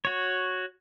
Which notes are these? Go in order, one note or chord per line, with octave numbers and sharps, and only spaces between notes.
F#4 C#5